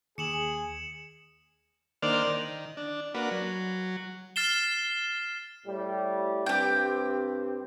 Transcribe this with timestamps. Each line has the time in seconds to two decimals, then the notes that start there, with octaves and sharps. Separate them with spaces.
0.18 D#2 G#4 C#7 E7 F#7
2.03 D#3 A#3 D4 C5 D5 F6
2.27 D#3
2.77 D4
3.14 A#3 D4 F#4 B4
3.31 F#3
4.36 F6 A6 C7 E7 G7
5.66 A2 G3
6.46 G2 C4 G4 G5